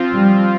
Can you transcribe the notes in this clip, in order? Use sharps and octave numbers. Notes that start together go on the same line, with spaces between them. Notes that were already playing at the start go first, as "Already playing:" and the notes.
Already playing: F3 C4 F4
G3